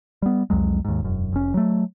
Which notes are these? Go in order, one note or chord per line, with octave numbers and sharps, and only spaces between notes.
G3 B3
C2 F2 F#3 G#3
D#2 G#2
E1 F#2
F1 C#4
F#3 A3